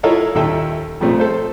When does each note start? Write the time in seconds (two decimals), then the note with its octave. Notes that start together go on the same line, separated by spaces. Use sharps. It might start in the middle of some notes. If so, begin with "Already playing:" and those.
0.03 E4 F4 A4 A#4 C#5 D#5
0.35 D#2 A#2 F4 A4 E5 G5
1.01 F2 A#2 A3 C4
1.20 A4 C5